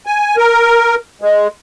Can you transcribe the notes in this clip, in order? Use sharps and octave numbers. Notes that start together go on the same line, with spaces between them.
G#5
A#4
G#3